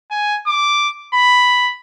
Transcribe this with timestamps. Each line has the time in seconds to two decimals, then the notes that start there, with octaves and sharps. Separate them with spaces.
0.11 G#5
0.47 D6
1.14 B5